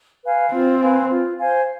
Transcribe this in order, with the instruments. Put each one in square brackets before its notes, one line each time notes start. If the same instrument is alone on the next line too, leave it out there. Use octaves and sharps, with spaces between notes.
[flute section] B4 F5 G#5
[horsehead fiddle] C4 [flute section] F4
[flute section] B4 F5 G#5
F4
C5 F5 G#5